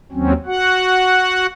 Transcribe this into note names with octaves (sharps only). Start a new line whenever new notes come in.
D#2 F#3 C4 C#4
F#4 F#5